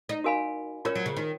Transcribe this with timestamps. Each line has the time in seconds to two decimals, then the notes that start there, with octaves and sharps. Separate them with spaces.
0.09 D#4
0.24 F#4 A#4 F5 G#5 B5
0.85 C#4 F4 A#4 C#5
0.95 F#3
1.06 C#3
1.16 D#3